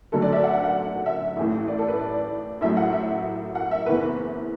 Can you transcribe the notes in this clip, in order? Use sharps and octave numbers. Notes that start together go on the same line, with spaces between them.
D2 D3 F#3 A4
D5
E5
F#5
F#5
F#5
E5
A1 A2 E3
D5
A4
B4
D5
A1 A2 F#3 E5
F#5
E5
F#5
E5
F#1 E2 E3 B4